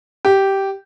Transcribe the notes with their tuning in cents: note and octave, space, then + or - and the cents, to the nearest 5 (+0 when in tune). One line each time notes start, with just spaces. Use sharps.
G4 -10